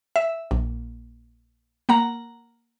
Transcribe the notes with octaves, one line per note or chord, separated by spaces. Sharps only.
E5
A#1
A#3 F#5 A#5